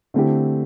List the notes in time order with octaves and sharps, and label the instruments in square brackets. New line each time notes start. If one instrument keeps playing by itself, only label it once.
[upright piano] D3 A3 C4 E4 G4